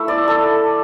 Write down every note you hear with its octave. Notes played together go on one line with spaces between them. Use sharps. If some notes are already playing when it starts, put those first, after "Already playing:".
Already playing: A3 E4 E5
D5
A4